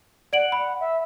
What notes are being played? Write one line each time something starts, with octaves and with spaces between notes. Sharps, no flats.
D5 F#5 D7 F#7
B5
E5